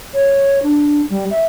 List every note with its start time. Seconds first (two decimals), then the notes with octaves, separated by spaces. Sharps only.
0.14 C#5
0.63 D4
1.10 G3
1.30 E5